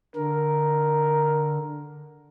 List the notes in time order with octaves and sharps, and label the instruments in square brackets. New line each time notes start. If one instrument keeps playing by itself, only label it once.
[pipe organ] D3 [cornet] A#4